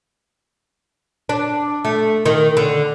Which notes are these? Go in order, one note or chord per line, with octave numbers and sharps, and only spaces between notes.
D4
A3
D#3
D3